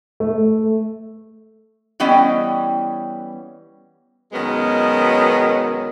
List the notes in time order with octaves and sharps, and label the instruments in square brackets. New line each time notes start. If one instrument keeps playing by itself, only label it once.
[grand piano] A3
[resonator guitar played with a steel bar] E3 G3 B3 C#4 D#5 G5
[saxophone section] F#2 B2 D#3 G#3 B3 C#4